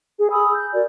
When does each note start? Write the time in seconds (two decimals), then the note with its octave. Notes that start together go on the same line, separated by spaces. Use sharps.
0.19 G#4
0.31 G#5 B5 D#6 E6
0.54 G6
0.73 F#4 A#4 D5